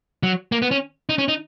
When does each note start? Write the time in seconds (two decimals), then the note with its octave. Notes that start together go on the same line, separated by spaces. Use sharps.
0.23 F#3
0.52 A#3
0.62 B3
0.71 C#4
1.09 D#4
1.18 C#4
1.28 D#4